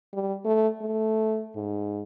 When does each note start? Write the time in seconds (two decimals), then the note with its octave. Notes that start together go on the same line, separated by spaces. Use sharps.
0.13 G3
0.45 A3
0.82 A3
1.56 G#2